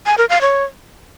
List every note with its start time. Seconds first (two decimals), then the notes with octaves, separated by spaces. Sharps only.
0.06 G#5
0.18 A#4
0.29 F5
0.41 C#5